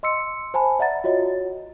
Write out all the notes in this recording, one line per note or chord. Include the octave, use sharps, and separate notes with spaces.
D#5 C6 E6 C#7
C5 G#5 A5 B5
D5 E5 F#5 A#5 A6
F4 F#4 C#5 D#5